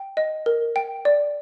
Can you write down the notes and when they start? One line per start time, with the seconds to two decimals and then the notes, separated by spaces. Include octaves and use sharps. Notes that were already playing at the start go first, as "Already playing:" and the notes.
Already playing: G5
0.17 D#5
0.46 A#4
0.76 G5
1.05 D5